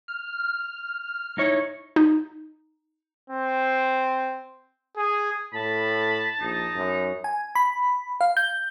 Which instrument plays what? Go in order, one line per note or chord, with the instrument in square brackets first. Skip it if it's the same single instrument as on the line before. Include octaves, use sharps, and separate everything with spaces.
[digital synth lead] F6
[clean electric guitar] D#4 E4 C#5
[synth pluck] D#4
[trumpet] C4
G#4
[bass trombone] A2 [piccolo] A5 [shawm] B5
[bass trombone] A#1 [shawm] D#4
[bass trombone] F#2
[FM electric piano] G#5
B5
F5
G6